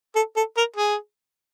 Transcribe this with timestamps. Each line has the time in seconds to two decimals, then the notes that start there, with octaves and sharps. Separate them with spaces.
0.15 A4
0.36 A4
0.57 A#4
0.77 G#4